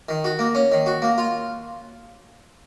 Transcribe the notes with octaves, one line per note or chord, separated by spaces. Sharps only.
D#3
F#4
A#3
C#4
D#3
F#4
A#3
F4